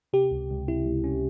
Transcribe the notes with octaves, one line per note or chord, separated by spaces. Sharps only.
C3 G4
C#2
C#2
C3 E4
C#2
C#4